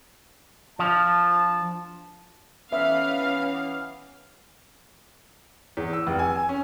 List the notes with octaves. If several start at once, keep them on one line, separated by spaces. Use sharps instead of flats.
F3 D4 F4 A5
E3 B3 C#4 E5 F5
E2
E6
F1
G#5
G#5
C#4